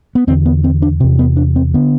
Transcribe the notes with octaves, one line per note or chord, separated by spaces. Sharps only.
B3
E2 D3 C4
B3
C4
D4
E2 C3 C4
B3
D4
C4
D3 B3